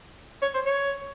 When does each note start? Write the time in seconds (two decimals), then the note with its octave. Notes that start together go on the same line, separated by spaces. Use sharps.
0.42 C#5
0.54 C5
0.66 C#5